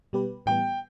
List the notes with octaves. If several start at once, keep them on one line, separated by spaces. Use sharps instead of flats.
B2 G3 B3 G4 B4
A2 E3 G3 B3 G5